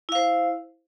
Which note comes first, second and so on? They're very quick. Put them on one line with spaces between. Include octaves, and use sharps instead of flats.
E4 F5 C5